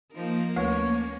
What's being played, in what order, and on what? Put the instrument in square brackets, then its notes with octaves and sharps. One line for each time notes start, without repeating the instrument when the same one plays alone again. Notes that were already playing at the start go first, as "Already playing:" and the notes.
[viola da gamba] F3 D#4 A#4 [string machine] A#3
[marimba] D2 A3 B4 [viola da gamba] C#4 [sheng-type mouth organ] C#5